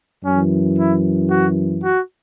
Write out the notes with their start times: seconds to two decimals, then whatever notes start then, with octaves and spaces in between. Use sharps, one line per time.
0.24 F#2 E3 C#4
0.78 E4
1.30 F#4
1.84 F#4